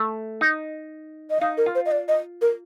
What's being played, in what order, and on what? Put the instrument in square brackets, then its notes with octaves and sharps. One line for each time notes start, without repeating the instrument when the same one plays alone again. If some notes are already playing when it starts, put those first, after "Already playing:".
Already playing: [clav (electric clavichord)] A3
D#4
[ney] D#5
[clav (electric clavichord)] D#4 [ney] F5
[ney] A#4
[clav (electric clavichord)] F4
[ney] C5
D#5
D5
D#5
A#4